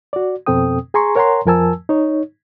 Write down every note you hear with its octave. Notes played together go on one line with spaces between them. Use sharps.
F#4 D5
F2 B2 C4 A4 G5 D#6
G#4 G#5 A#5 C6 C#6
A#4 C#5 F#5 G#5 A#5 C6
F2 F3 A#4 G#5 A5 E6
D#4 C#5